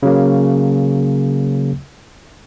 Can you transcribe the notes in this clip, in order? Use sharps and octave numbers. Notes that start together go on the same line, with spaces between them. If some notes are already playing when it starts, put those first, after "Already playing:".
C#3 F#3 A#3